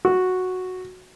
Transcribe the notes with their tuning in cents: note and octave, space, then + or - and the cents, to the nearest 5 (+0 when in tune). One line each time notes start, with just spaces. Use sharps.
F#4 -5